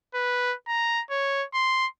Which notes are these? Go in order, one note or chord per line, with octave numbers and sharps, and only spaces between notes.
B4
A#5
C#5
C6